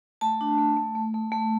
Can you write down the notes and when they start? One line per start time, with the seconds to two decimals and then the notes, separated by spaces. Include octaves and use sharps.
0.21 A3 A5
0.41 D4
0.58 A3
0.77 A3
0.95 A3
1.14 A3
1.32 A3